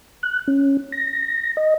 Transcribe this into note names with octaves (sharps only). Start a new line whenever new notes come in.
F#6
C#4
A#6
D#5